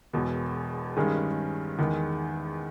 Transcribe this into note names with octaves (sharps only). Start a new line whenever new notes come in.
E1 E2 B2
G2 D#3 G#3 C#4 G#4
E2 D#3 G#3